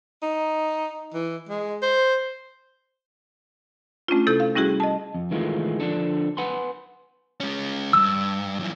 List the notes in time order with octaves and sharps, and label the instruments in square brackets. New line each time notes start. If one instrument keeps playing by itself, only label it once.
[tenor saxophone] D#4
E3
G#3
C5
[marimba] A3 C#4 D4 F4
C3 E4 A4 G6 A6
F5
G3 C#4 E4 F#4 G#4
D#5 A5
[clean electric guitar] F2
D#3 E3 G#3 A3 F4
D3 F3 D4 A4
B4 F#5 G#5 B5 C6
[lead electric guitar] G#3 C#4
[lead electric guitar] E2 G2 [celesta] E6
[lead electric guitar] F#2 E3